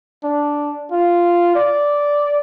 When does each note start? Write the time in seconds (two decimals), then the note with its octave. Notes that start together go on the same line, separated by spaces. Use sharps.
0.24 D4
0.92 F4
1.55 D5